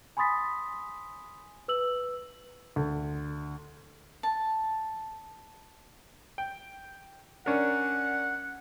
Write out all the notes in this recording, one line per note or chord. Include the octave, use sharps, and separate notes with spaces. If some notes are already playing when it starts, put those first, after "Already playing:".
G#5 B5 C6 D#6 A6 B6
B4 E6 F#7
D2
A5
G5
C#4 D4 A#4 F#5